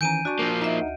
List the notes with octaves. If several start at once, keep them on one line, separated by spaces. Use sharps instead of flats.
D#3 E3 C#4 G#5 A#5 G6 D7 D#7
D4 F#4 D5 A5 C#6
F3 A#3
D#4 D#5 E5
D2